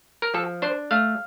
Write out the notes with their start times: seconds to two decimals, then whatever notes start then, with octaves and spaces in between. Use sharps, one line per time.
0.22 A#4
0.34 F3 A4
0.62 D4 C5
0.91 A3 F5